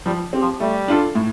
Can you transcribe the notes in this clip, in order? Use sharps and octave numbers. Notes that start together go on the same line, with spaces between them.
F3 G3
C4 G4
F3
G3 A3
D4 F4 A4
A2